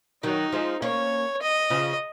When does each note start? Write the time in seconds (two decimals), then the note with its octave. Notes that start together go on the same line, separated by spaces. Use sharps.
0.23 D#3 F#3 D#4
0.52 F3 G#3
0.82 A#3 C#4 C#5
1.42 D#5
1.70 C#3 F3